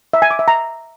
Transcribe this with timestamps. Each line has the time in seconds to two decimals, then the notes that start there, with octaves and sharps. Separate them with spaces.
0.13 E5
0.22 G#5
0.31 D6
0.39 E5
0.48 A#5